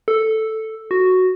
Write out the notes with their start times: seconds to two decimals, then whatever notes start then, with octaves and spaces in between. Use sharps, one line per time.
0.08 A4
0.91 F#4